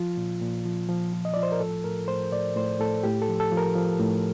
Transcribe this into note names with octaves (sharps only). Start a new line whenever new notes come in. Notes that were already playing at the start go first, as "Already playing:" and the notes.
Already playing: F3 F4
A#2
A#2
F3
F3
F3
D#5
F3 D5
C5
A#4
A2 A4
A2 A#4
A2 C5
A2 D5
A2 C5
A2 A4
A2 G4
A4
F3
A4
F3
A#4
F3
A2